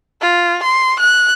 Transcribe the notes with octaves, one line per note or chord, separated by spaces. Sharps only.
F4
C6
F#6